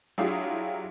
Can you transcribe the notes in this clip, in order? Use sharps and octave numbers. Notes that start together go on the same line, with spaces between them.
F#3 D4 E4 F4 G4 G#4